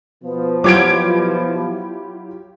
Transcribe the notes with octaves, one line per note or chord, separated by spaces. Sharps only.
B2 F3 B3
F#3 E4 F4 G4 D6 G#6 D7